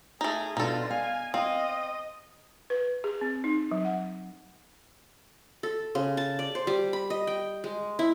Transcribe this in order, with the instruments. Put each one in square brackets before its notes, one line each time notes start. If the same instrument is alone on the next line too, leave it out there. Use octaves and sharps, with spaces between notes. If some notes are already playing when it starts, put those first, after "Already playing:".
[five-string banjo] A3 D#4 [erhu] G#4
[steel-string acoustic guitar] B2 D4 [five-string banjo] D#4 A4 [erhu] F4
[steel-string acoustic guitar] F5 [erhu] G#5
[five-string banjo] C4 [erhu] D#5 [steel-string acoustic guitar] F5
[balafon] B4
G#4
C4
D#4
F#3
F#5
[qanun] A4
C#3
A5
D5
C5
G3
B5
D#5
G5
G#3
E4